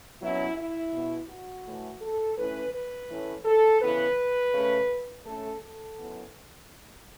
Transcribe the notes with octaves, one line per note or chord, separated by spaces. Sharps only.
B2 F#3 C#4 E4
E4
B2 B3
F#4
A2 E3 A3
A4
A2 E3 C#4 B4
B4
A2 E3 A3 C#4
A4
C#3 E3 B3 B4
C#3 A3 C#4
A2 A3 C#4 A4
A4
F#2 E3 B3